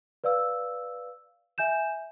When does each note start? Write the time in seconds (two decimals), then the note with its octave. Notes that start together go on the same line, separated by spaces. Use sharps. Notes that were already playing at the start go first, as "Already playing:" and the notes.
0.24 B4 D5 F5 E6
1.58 E5 G#5 G6 E7